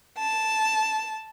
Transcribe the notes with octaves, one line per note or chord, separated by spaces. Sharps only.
A5